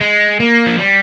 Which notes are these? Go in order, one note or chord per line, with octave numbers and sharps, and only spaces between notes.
G#3
A#3
F3
G3